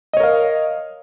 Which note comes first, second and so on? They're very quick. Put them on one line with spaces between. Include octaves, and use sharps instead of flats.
D#5 C#5 A#4 F5